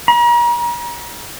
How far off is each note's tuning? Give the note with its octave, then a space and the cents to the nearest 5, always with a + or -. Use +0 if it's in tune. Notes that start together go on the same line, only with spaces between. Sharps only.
A#5 +40